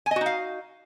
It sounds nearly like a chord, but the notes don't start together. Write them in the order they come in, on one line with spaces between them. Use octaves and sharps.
G#5 D#5 F#4 D#4 F5